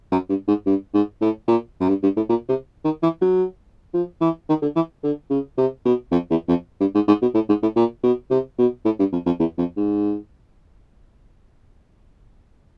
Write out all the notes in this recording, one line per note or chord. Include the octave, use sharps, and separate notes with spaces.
F#2
G2
G#2
G2
G#2
A2
A#2
F#2
G2
G2
A2
A#2
C3
D#3
E3
F#3
F3
E3
D#3
D3
E3
D3
C#3
C3
B2
F2
E2
F2
G2
G#2
G#2
B2
A2
G#2
A2
A#2
B2
C3
B2
A2
G2
F2
F2
E2
F2
G#2